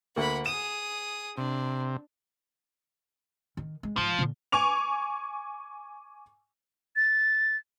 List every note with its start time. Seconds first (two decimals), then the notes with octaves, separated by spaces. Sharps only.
0.16 D2 A#3 F#5 B5
0.46 G#4 D#6 E7
1.37 C3 D4
3.57 D#3
3.83 G#3
3.97 G#2 F3
4.19 A#2 D3
4.52 G#5 C#6 D6 F7
6.96 A6